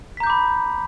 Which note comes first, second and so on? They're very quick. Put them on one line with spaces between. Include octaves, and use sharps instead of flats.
B6 A#5 G6 D6 B5